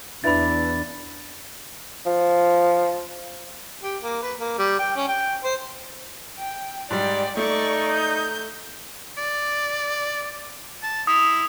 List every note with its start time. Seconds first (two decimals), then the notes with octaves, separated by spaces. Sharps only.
0.24 E2 D4 E4 B4 E5 B5 A6
2.06 F3
3.83 G4
4.02 A#3
4.22 B4
4.40 A#3
4.58 G3
4.79 G5
4.96 C#4
5.08 G5
5.44 C5
6.38 G5
6.90 G#2 G3 D5 G5
7.37 A3 D#4 D5 C#6
7.92 G6
9.18 D5
10.83 A5
11.07 E4 D#6